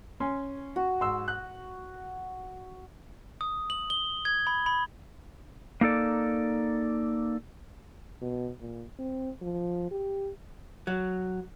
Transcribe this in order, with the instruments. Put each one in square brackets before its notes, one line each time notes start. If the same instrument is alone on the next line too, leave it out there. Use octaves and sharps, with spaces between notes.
[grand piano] C#4 G#5 C6
[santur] F#4
[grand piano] G#2 C6 E6
F#6
[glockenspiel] D#6
F#7
G7
G#6
B5
B5
[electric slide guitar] A#3 D#4 A4 D5
[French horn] B2
A#2
C4
F3
G4
[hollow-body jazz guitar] F#3